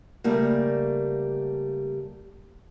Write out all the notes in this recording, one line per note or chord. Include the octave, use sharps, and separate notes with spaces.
C#3 G3 A3 A#3